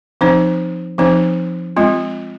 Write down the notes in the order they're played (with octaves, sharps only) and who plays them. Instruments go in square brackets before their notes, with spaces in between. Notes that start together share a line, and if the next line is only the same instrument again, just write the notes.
[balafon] F3 C4 D#4 C5
F3 C4 D#4 C5
G#3 C4 F4